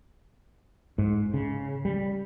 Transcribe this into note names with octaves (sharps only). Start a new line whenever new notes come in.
G#2
C#3
G3